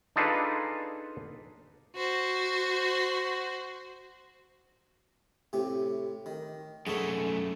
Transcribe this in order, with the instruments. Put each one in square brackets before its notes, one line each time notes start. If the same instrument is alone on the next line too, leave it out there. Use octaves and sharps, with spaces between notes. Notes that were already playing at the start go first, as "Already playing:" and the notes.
[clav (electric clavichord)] D4 D#4 F4 G#4 A4 B4
[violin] F#4 C5
[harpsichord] A2 C3 G4
D#3
[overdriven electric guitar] F#2 A3 [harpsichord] G#4 A4 C#5